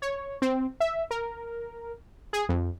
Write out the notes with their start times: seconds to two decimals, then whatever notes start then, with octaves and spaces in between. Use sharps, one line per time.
0.02 C#5
0.42 C4
0.80 E5
1.11 A#4
2.33 G#4
2.49 F2